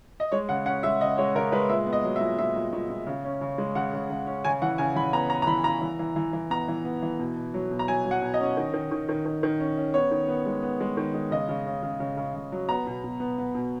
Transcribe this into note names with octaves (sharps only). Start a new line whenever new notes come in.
D#5
G#3 C#5
C#3 F#5
C#4 F#5
G#3 E5
C#3 D#5
G#3 C#5
C#3 A#4
G#3 B4
A#2 E5
B3
D#5
F#3
E5
A#2
A#2 E5
A#2
A#2
A#2
C#3
C#4
C#3
G#3
C#3 F#5
C#3
C#3
C#4
C#3 G#5
E3 F#5
C#3 G#5
E3 B5
B3 A#5
B3 A#5
A#5
E3 B5
C#3 A#5
E3
E3
E3
E3
B3 A#5
E3
B3
E3
B2
B2
F#3
B2
A#5
F#3 G#5
F#3
F#5
B2
D#5
C#4
D#3
D#3
D#3
D#3
D#3
D#3
C#4
C#4
B3 C#5
D#3
B3
G#3
B3
G#3
D#3
G#3
C#3 D#5
C#3
C#3
C#3
C#3
C#3
C#3
F#3
B3 A#5
B2
B2
B3
B3
B2